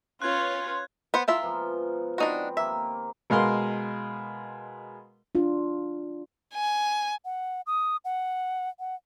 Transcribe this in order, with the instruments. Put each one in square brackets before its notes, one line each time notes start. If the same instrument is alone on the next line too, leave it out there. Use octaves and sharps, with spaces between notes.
[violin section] C#4 B4 C#5 [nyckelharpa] F4 [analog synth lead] C6 [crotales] F#6 G#6
[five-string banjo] B3 C5 F#5
[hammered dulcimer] G#3 A#4 [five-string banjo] E4 F4 E5
[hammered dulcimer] B2 F3
[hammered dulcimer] C4 B4 [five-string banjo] D4 D#4 F#4
[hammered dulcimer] D#3 A#3 G4 [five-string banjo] E5
[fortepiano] B2 G#3 A#4 F5 C6
[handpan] D4 F4
[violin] G#5
[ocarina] F#5
D#6
F#5
F#5